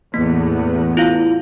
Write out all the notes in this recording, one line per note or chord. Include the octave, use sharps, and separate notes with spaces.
E2 A2 A#3 B3
E4 F4 F5